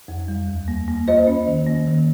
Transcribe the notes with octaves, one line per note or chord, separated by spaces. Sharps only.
F2
G3
D#2
A#3
A#3
F4 C5 D#5
C#4
D#3
A#3
D#3